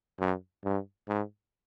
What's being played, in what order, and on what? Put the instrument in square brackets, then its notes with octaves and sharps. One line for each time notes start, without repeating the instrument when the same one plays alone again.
[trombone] F#2
G2
G#2